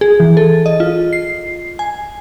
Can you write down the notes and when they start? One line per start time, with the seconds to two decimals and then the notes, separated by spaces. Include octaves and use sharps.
0.01 G#4
0.20 E3
0.37 A4
0.66 D#5
0.80 F4
1.13 C7
1.79 G#5